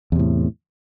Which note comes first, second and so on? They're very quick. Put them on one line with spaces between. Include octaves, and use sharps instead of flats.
E2 C3 A2